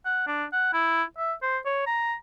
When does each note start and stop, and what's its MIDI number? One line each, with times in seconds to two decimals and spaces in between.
0.05 0.24 78
0.27 0.44 62
0.53 0.70 78
0.73 1.03 64
1.18 1.33 76
1.42 1.58 72
1.65 1.82 73
1.87 2.15 82